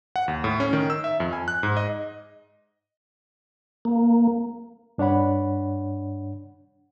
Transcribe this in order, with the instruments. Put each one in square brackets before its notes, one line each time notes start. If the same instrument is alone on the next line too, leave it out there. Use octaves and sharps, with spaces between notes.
[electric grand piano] F#5
D#2
A2
C#4
D#3
E6
E5
F2
G#5
F#6
G#2
D#5
[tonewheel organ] A#3
[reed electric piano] G2 D4 C#5 F#5 B5